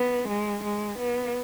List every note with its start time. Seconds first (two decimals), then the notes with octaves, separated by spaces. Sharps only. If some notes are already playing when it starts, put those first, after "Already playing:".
Already playing: B3
0.29 G#3
0.64 G#3
0.99 B3